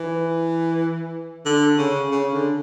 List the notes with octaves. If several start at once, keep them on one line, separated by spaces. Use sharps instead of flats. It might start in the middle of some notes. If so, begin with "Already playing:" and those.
Already playing: E3
D3
C#3
C#3
D3